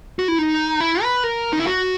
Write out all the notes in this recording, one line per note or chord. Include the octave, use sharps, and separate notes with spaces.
F#4
E4
D#4
E4
B4
A#4
D#4
E4
F#4